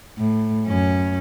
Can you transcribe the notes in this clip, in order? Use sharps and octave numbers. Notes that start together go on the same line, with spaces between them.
A2
F#2 C#4